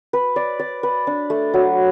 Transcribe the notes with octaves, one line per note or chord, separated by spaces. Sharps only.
B4
D5
D5
B4
D4
A3
F#3